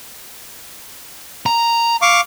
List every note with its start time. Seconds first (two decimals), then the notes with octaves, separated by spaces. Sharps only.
1.46 A#5
2.02 F5 C#6 D6